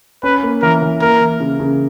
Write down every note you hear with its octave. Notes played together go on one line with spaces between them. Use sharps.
C#4 B4
A#3
E3 A#4
E3
A#3 A#4
E3
C#3
C#3